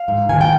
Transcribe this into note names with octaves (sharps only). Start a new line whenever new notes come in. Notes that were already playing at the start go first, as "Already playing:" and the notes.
Already playing: F5
G#2
D#3 G#5
G5